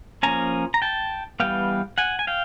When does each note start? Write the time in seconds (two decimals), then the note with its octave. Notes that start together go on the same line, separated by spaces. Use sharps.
0.23 F3 A#3 C#4 G#5 A#5
0.74 A#5
0.82 G5 A5
1.40 E3 G3 B3 F5 G5
1.98 F#5 G#5
2.19 G#5
2.27 F5 G5